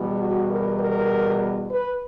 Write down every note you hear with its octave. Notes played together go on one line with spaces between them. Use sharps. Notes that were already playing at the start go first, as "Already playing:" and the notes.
Already playing: E2 B2 G3
F#4
A#4
A#4
B4